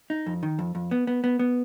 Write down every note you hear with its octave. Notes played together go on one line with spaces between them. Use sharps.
D#4
F2
D#3
F2
F2
B3
B3
B3
B3